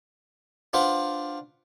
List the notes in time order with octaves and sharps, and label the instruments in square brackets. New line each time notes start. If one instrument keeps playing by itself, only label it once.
[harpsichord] D4 F4 B4 C5 F#5